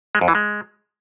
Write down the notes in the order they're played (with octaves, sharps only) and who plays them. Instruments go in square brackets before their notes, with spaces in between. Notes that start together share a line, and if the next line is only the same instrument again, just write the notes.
[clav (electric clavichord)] G#3
F2
E3
G#3